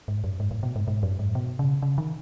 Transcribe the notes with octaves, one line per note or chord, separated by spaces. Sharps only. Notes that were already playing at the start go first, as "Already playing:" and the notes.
G#2
F#2
G#2
A2
B2
G#2
G#2
F#2
G#2
B2
C#3
C#3
D#3